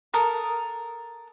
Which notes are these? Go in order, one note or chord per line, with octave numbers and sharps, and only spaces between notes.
A4 A#4 D#6